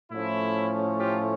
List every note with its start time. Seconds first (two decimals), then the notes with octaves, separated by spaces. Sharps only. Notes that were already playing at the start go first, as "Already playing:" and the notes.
0.12 A2 F3 A3 C#4 E4
0.99 F4 G4